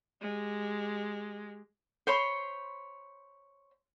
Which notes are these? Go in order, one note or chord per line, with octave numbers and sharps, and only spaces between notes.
G#3 G4
C5 C#5 B5 C6